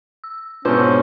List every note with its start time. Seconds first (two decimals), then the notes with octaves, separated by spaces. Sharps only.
0.24 E6
0.65 G#2 B2 C#4 D4 F4 B4 C5 E6